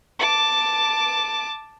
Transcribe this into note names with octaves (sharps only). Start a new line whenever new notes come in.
A5 D6